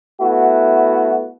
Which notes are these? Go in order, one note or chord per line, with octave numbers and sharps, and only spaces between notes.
A3 B3 E4 F#4